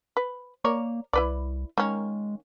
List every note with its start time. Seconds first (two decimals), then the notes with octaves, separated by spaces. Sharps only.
0.17 B4
0.64 A#3 A#4 C#5 D5
1.13 C2 E4 B4 D5
1.78 D#3 G#3 A#3 C#4